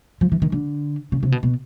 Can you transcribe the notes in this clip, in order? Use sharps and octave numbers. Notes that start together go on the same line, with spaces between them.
F3
E3
D#3
D3
C#3
C3
B2
B2